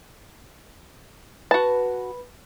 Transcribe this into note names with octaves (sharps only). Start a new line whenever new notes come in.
F#4 B4 A5